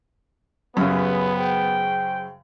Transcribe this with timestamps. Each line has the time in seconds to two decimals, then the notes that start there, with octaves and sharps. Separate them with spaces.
0.77 F#2 C#3 B3 G4 G#4 B4
1.36 G#4 C5 G5